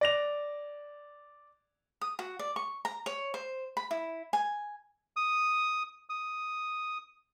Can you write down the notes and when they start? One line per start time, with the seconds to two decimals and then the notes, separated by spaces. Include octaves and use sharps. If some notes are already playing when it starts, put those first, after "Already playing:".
0.01 D5 A#6 F7
2.01 D#6
2.19 F#4
2.39 D5
2.56 C#6
2.85 A#5
3.06 C#5
3.34 C5
3.77 B5
3.91 E4
4.33 G#5
5.17 D#6
6.10 D#6